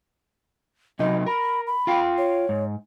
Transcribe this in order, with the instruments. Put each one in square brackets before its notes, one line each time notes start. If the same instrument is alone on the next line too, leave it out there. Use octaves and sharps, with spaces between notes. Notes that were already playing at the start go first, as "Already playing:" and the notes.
[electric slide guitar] C3 F#3 D#4 [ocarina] D#5
[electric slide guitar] A#4 [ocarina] B5
[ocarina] B5
[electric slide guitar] F4 F5 G5
[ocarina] C#5
[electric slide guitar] G#2